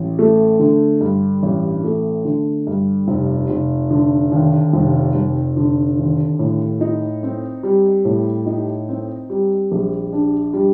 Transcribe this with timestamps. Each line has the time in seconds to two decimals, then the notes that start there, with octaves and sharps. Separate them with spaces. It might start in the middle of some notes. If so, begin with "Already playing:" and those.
Already playing: A1
0.19 A3
0.59 D3
1.01 G2
1.43 A1
1.84 A3
2.25 D3
2.67 G2
3.08 F1
3.50 F1
3.91 D3
4.32 D#2
4.73 F1
5.15 F1
5.57 D3
5.98 D#2
6.39 A2
6.81 D#4
7.23 C4
7.63 G3
8.05 A2
8.46 D#4
8.89 C4
9.30 G3
9.72 A#1
10.13 D4
10.53 G3